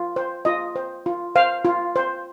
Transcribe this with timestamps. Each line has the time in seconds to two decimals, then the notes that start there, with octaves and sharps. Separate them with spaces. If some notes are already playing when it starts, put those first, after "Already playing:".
Already playing: F4
0.16 C5
0.45 F4 D#5
0.76 C5
1.06 F4
1.36 C5 F5
1.65 F4
1.96 C5